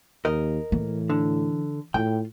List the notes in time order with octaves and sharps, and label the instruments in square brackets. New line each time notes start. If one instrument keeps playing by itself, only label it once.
[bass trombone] D#2 [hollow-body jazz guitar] A#4 D#5
[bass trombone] A2 [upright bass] E3
[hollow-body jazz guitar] D3
[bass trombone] A2 [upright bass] F4 [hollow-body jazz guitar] G5